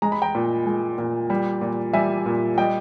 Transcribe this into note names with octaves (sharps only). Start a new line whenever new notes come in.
G#3 A#5
B5
G5 A#5
A#2
G#3
A#2
G3
A#2
G3 E5 G#5
A#2
G3 D#5 G5